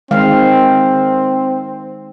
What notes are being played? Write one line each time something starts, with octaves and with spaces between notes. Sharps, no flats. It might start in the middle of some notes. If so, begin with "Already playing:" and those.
D#3 G#3 C4 F5